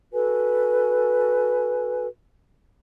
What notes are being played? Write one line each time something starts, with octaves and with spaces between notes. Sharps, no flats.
F#4 A4 B4 G#5